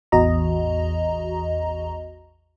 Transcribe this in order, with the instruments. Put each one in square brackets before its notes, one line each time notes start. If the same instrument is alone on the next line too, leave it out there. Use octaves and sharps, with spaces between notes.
[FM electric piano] A1 E2 F#4 D#5 A#5